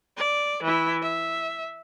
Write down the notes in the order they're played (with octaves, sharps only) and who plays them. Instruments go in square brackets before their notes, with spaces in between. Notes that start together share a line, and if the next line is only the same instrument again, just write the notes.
[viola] D5
E3 E4
E5